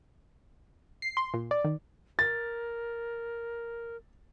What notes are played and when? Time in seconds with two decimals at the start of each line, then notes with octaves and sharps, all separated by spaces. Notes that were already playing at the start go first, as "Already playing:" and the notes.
1.02 C7
1.17 C6
1.34 A#2
1.51 D5
1.64 D#3
2.19 A#4 A6